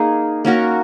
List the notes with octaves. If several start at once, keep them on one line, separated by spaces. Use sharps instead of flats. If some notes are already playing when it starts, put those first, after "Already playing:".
Already playing: A#3 D#4 G#4
A#3 C#4 F#4 A#4